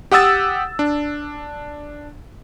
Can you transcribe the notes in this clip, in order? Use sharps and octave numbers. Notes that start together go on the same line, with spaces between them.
G4 F#5 D#6 E6 A6
D4